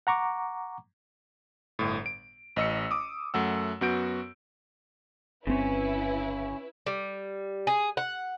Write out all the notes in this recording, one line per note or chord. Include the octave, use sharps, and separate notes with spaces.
F#5 A#5 C#6 D6
G1 A2
D7
A1 D#5 E6 C#7
D6 D#6
F#2 A3 F#5 E6
F#2 B3 F#4 G6 D7
G1 C#3 C4 C#4 E4 B4
G3
G#4
F#5